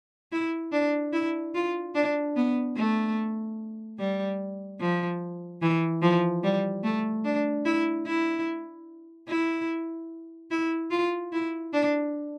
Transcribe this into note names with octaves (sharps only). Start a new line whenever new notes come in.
E4
D4
E4
F4
D4
B3
A3
G3
F3
E3
F3
G3
A3
D4
E4
E4
E4
E4
F4
E4
D4